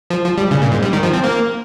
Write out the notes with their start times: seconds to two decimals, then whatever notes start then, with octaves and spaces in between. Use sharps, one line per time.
0.10 F3
0.24 F3
0.38 G3
0.51 C#3
0.62 A#2
0.72 G#2
0.82 G3
0.93 D#3
1.03 F3
1.13 C4
1.24 A#3